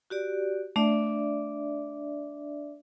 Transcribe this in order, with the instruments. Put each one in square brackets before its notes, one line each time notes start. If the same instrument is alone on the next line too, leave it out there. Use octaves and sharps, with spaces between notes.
[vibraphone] F#4 G4 D5
[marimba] A3 [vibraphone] D4 D5 E5